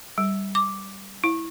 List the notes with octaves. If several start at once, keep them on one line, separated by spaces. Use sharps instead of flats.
G3
D6
E4